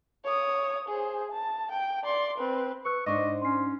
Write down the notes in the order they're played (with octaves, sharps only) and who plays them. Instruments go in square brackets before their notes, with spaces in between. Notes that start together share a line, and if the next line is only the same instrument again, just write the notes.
[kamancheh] C#5 D#6
G#4 C5
A5
G5
D5 C6
C4 B4
[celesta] B4 E6 F#6 [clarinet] C#6
[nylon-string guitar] G#2 D4 C5 [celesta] D5 C#6 D6 [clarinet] D#5
[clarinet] C#4 [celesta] C6 C7